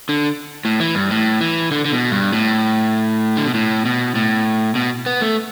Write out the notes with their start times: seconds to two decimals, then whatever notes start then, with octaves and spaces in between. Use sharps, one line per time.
0.09 D3
0.65 A2
0.80 E3
0.95 G2
1.10 A2
1.41 E3
1.71 D3
1.85 D3
1.92 B2
2.11 G2
2.33 A2
3.37 D3
3.46 B2
3.54 A2
3.85 B2
4.15 A2
4.75 B2
5.06 B3
5.21 A3